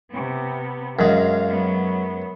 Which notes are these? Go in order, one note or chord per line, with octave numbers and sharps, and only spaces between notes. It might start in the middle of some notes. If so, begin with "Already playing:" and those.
C3 B3
F#2 G#3 F5
F#3 B3